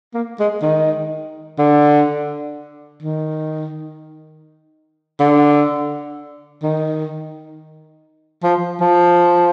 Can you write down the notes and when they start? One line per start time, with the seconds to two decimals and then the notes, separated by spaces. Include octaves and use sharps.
0.14 A#3
0.40 G#3
0.62 D#3
1.59 D3
3.03 D#3
5.20 D3
6.63 D#3
8.43 F3
8.80 F3